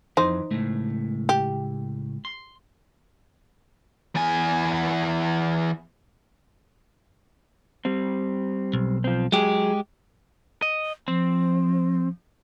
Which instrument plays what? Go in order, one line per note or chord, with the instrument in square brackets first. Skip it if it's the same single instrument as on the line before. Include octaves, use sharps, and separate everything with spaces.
[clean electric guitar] F2 E3 [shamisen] D#4 C5
[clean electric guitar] C#2 A2 A3
[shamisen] G4
[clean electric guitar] C6
[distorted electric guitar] E2 G#5
[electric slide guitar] G3 C4
[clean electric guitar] B1
[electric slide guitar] F3 C4
[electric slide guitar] F#3 G#4 [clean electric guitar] G#3 G4
[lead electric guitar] D#5
[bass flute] F3 [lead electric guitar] C4